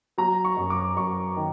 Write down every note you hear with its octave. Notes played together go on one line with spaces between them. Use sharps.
F#3 A#5
C#6
F#2
D6
F#2 C#6
D#3